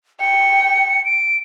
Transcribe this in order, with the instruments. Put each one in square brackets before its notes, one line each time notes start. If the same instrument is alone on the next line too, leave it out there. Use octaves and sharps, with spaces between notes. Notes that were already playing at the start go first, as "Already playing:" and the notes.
[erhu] G5 [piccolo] C#7
[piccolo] D7